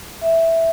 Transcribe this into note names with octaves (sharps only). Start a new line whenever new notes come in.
E5